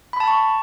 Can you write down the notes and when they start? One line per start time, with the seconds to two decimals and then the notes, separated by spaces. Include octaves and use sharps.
0.13 B5
0.20 A5
0.27 C#6